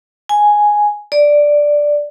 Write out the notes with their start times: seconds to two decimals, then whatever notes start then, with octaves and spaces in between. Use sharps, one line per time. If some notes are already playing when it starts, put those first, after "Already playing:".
0.29 G#5
1.12 D5